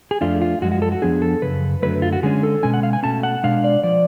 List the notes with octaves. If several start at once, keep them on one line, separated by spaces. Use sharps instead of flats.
G#4
F2 F3 A3 D4 F4
F4
F#2 F3 G#3 F#4
F#4
A4
F#4
F2 F3 B3 D4 G#4
A4
F#2 C#3 B4
F#2 D3 F#3 A3 B4
F4
F#4
D3 G#3 C#4 G#4
A4
B2 G#3 C#4 G#5
F#5
F5
G#5
B2 A3 C#4 A5
F#5
B2 G#3 D4 F5
D5
F3 D5